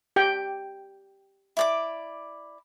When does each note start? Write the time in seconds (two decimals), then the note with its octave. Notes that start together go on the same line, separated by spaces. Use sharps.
0.16 G4 G5
1.57 E4 D5 D6